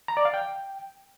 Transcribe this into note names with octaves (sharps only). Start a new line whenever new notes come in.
A#5
D5
F5
G5